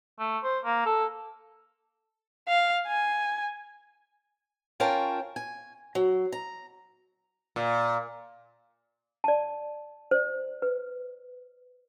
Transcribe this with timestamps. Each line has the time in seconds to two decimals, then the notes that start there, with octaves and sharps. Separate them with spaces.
0.19 A3
0.43 C5
0.65 A#3
0.86 A4
2.48 F5
2.87 G#5
4.80 C#4 F4 A#4 C#5 G5 A5
5.36 G#5
5.95 F#3
6.32 A#5
7.56 A#2
9.24 D5 A5
10.11 C5 D5
10.62 B4